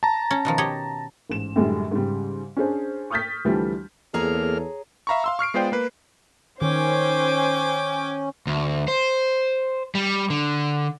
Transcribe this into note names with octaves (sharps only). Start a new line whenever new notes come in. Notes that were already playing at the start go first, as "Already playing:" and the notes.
A5 A#5
C#4
B2 D#3 F3
G4 C#5 D#5
A1 G#2 E7
F#2 A2 D3 G3 G#3
G#2 C#3 G3
C#4 D4 G#4 C5
C#6 D#6 F6 G6 A6 B6
D2 E3 F3 G3 A3
E2 A#3 G#4 A4 C#5 A#5 F6
E5 F5 A#5 B5 C#6
F5 C6 E6
C#6 F6 C7 D7
G#3 B3 F4 C5 D5 G5
A#3 B4
D#3 C#4 C5 G5 G#5 D6
D2
C5
G3
D3